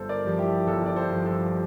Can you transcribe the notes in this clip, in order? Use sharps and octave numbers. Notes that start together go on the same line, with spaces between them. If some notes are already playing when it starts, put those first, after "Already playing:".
Already playing: G1 A4 C5
A#4 D5
G2 F3
E4 G4
G1 F4 A4
D5
A4 C5
G2 F3
A4 C5